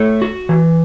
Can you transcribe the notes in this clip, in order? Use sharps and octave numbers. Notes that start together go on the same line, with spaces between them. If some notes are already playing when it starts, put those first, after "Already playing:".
Already playing: A3 C#5
F#4
E3